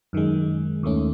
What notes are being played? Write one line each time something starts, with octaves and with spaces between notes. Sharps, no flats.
F#2 D#3 G#3
D#2 D#3 A3 C#4